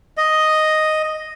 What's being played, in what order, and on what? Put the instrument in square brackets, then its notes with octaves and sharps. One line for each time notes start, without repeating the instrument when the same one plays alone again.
[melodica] D#5